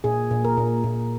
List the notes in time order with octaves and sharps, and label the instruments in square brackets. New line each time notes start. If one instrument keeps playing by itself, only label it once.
[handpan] A#2 G#4
A#2
A#4
A#2
A#2